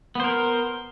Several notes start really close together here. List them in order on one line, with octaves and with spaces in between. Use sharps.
B3 C5 A#4